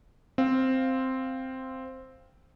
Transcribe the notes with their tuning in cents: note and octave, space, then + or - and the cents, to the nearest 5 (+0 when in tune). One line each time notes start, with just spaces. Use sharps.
C4 +0 F5 +0